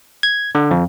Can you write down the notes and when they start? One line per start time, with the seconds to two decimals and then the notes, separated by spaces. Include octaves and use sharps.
0.23 G#6
0.55 D3
0.71 F2